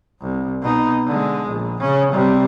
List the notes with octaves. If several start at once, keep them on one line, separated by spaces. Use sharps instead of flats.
C2
B2 D#4
D3 G#3
A#1
C#3 C#4
C3 G3